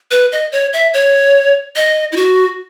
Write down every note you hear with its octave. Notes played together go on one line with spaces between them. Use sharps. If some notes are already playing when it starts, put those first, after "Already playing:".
B4
D#5
C#5
E5
C#5
D#5
E4
F#4